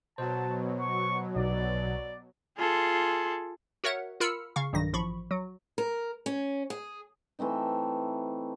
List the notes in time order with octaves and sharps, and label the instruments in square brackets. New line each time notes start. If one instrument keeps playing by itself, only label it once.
[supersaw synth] B2 F#3 [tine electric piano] C5 [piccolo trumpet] A5
[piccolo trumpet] C#6
[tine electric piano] B1 [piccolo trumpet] D5
[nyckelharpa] F4 C6 [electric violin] G#4 A4
[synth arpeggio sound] F#4 A#4 C#5 E5 F#5
F4 A#4 B5 E6 F6 C#7
C#3 F5 C#6
B1 G2 D#3 A#6
A1 F3 B5 C#6
F#3
[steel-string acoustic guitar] A#4
C#4
G#4
[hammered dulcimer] E3 A3 C4 D#4